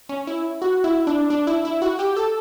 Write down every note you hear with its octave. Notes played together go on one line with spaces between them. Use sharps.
C#4
E4
F#4
E4
D4
D4
E4
E4
F#4
G4
A4